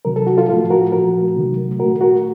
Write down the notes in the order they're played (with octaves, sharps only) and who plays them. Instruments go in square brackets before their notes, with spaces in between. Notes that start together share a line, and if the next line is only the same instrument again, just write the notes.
[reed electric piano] C3 D#3 F#3 A#4
A4
F#4
F4 A4
A2 F3 A3 F4 A4
F#4 A#4
A#2 F3 A3 F#4 A#4
C3 D#3 F#3 A3
A#2 A3 F#4 A#4
F#4 A#4